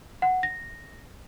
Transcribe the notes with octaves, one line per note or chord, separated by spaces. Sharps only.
F#5
A#6